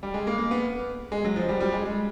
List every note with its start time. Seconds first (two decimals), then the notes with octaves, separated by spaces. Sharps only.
0.03 G3
0.14 G#3
0.27 A#3
0.38 A#3
0.51 B3
1.12 G#3
1.25 F#3
1.36 F3
1.49 G3
1.60 G3
1.72 G#3
1.85 G#3